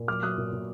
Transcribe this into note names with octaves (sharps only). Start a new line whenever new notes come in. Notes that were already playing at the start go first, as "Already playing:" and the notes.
Already playing: A#2
F#3 D6 F6
F#3 D#6 F#6
A#2
A#2